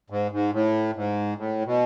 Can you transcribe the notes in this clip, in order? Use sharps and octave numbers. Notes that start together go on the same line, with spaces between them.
G#2
G#2
A2
G#2
A2
B2